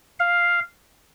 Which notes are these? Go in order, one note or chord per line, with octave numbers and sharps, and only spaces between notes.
F5